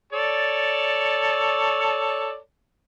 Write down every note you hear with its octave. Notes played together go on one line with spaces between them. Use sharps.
A4 C#5 D5